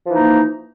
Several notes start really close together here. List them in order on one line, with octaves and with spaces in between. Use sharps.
F3 E3 D#4 A#3